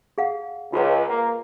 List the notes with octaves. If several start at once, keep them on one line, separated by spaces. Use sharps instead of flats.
G#4 F5 F#5
C#2 F4 G#4 B4
A#3